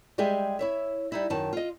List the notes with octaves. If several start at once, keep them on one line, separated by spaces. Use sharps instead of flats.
G3 G#3 G4 G#4 E5
E4 C#5 E5
G3 D#4 E4
F#2 D#3 A5
F4 D#5